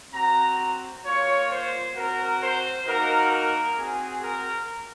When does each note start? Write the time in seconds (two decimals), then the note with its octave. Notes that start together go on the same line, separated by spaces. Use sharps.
0.13 C4 F#4 A#5
1.04 A#3 F4 C#5
1.50 C5
1.95 C4 F#4 A#4
2.40 C5
2.86 A#3 D#4 F#4 A#4
3.32 A#4
3.77 C4 F#4 G#4
4.23 A#4